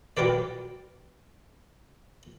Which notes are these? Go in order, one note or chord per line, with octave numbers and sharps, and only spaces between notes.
F#3 G3 G4 A#4 B4 D5